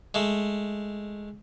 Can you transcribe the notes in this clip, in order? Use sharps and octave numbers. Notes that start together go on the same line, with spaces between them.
G#3 A3